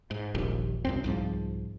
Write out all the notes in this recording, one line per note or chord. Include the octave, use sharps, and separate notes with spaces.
G#2
D#1 A#1 D#2
C2 F#2 C4
C2 G#2 F3